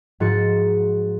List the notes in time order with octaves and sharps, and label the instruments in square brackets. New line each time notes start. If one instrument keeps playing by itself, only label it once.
[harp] G#2 F3 F#4 A6 C#7